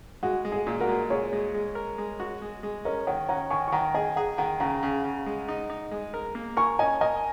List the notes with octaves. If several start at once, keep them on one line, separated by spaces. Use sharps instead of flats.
G#3 F#4
G#3
G#4
A#2
F#4 A#4
G#3
A#2 G#4 C#5
G#3
G#3
A#4
G#3
F#4
G#3
G#3
C#4 A#4 D#5
D#3 C#5 F#5
C#4 F#5 A#5
D#3 G#5 C#6
C#6
D#3 F#5 A#5
G#4 D#5 G#5
G#4 F#5 A#5
D#3 F#5 A#5
C#3 F#5 A#5
C#3
C#3
G#3
D#4
D#4
G#3
A#4
A#3
A#4 G#5 C#6
C#4 D#5 G#5
A#4 D#5 G#5